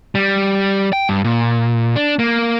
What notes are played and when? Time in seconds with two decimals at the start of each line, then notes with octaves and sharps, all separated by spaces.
0.15 G3
0.93 G5
1.09 G2
1.24 A#2
1.96 D4
2.19 A#3